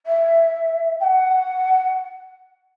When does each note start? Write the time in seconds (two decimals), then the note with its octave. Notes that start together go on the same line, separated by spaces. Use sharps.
0.06 E5
0.99 G5
1.03 F#5